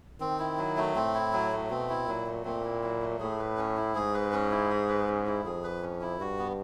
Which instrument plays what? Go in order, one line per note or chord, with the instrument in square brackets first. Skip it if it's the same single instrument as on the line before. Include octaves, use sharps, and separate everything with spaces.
[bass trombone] D#3 [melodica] C4
[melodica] E4
F#3
A3
[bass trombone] A2 [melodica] C4
[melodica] E4
F#3
A3
[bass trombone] B2 [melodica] C4
[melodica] E4
[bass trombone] A#2 [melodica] F#3
[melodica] A3
[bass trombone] A#2 [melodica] C4
[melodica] E4
F#3
A3
[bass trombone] A2 [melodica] G#4
[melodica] B4
C#4
E4
[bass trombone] G#2 [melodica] G#4
[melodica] B4
C#4
E4
G#4
B4
C#4
E4
[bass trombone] F2 [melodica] G#4
[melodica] B4
C#4
E4
[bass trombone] G2 [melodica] F#4
[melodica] B3